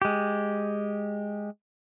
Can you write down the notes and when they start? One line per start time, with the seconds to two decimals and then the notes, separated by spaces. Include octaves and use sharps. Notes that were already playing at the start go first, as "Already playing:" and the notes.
0.02 G#3 G4